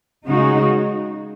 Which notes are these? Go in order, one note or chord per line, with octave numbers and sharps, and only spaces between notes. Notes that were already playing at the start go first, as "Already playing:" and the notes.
C#3 G#3 D#4 F#4